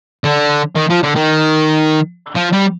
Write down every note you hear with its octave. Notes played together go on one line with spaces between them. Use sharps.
D3
D#3
F3
D3
D#3
F3
G3